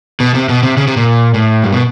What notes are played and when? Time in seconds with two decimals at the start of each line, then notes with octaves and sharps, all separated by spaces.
0.20 B2
0.35 C3
0.49 B2
0.63 C3
0.77 C#3
0.87 C3
0.97 A#2
1.34 A2
1.64 G2
1.73 B2